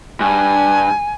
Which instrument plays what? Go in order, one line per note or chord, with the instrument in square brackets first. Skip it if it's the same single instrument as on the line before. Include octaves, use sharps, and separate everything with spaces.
[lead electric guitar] G2 [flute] G#5